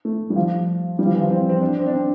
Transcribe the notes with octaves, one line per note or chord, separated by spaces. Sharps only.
A3
G3
F3
G3
F3
E3
F3
C4
C4
D4
C4
D4
C4